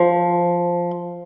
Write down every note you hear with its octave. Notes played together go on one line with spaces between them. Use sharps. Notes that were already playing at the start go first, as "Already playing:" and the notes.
Already playing: F3